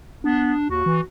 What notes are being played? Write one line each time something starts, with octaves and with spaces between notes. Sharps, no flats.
B3 D4
D#2 F#4
E3